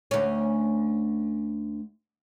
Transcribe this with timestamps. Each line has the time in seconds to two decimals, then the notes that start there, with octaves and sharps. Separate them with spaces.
0.11 D2 C#4